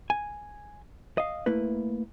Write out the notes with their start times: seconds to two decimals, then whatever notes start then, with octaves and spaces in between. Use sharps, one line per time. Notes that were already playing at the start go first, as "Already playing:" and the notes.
0.10 G#5
1.18 D#5 F5
1.46 A3 A#3 E4 B4